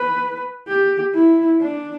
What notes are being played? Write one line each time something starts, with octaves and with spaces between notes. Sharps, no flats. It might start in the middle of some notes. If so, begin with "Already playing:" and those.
Already playing: B4
G4
E4
D4